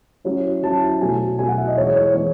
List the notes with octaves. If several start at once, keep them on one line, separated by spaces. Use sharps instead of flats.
F#3 C#4 E4
F#3 C#4 E4 A5
B2 F#3 A3 E4 G#5
B2 F#3 A3 E4 G#5
F#5
E5
D#5
E3 G#3 B3 E4 C#5
C#5
E3 G#3 B3 E4 C#5